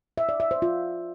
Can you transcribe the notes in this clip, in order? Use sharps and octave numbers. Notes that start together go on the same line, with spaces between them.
E5
D5
E5
C5
F4